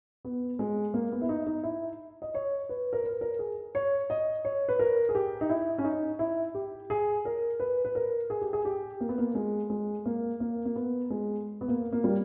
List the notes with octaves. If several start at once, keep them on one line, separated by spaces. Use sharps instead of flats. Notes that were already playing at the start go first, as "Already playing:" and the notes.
B3
G#3
A#3
B3
E4
D#4
D#4
E4
D#5
C#5
B4
A#4
B4
A#4
G#4
C#5
D#5
C#5
B4
A#4
G#4
G4
D#4
E4
C#4
D#4
E4
G4
G#4
A#4
B4
B4
A#4
G#4
G4
G#4
G4
A#3
B3
A#3
G#3
G#3
A#3
A#3
A#3
B3
G#3
B3
A#3
A#3
G3